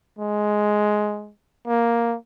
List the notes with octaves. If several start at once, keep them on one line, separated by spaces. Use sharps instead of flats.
G#3
A#3